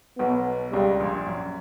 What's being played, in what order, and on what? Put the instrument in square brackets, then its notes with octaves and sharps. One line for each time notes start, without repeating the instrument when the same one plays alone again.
[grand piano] B1 B2 [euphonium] B3
[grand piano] C#2 C#3 [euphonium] G3
[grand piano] A#1 A#2
F#2